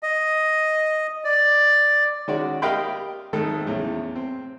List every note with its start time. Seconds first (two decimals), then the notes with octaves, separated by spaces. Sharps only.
0.03 D#5
1.25 D5
2.28 D#3 G#3 C#4 F#4 D5
2.62 G4 A#4 D#5 F5 G5 B5
3.33 G#1 G#2 D#3 A3 A4
3.66 E2 A2 C#3
4.15 C4